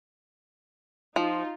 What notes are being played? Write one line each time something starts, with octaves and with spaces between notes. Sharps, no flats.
F3 D#4 F4